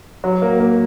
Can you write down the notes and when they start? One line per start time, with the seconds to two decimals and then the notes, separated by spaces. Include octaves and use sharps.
0.24 F#3
0.42 A#3
0.60 A#3